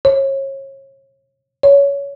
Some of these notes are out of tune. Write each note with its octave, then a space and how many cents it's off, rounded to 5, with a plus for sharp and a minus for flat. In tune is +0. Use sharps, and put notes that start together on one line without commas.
C#5 -30
C#5 +20